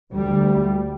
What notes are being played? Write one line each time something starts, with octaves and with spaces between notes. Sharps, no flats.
D2 G3